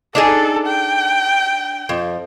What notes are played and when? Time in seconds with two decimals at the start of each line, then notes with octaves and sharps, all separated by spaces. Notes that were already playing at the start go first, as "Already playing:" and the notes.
0.15 D4 D#4 G#4 A4
0.67 G5
1.89 F2